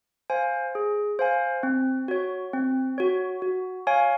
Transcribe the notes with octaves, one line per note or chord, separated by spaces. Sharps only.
C5 F5 G#5
G#4
C5 F5 G#5
C4
F#4 C#5
C4
F#4 C#5
F#4
C#5 F5 G#5